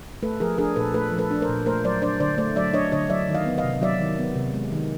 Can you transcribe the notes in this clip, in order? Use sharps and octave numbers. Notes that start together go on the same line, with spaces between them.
A3 A4 B4
F3 G#4 A#4
D4 G#4 A#4
A#2 A4 B4
A3 A4 B4
F3
A4 B4
D4
A#4 C5
A#2
A3 A#4 C5
F#3 C5 D5
D4 C5 D5
D3 C5 D5
A3 C5 D5
F#3 D5 E5
D4 C#5 D#5
D3 C#5 D#5
F#3 D5 E5
D#3
D#5 F5
B3
D#5 F5
C3
F#3 D5 E5
D#3
B3
C3
G#3
D#3